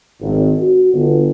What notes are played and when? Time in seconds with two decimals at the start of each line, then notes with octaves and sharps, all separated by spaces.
0.21 G#1
0.61 F#4
0.93 G1